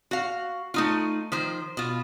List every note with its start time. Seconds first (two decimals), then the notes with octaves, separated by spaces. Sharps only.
0.11 F#4 F5
0.74 A3 D#4 F4
1.32 D#3 F3 C5
1.77 B2 F4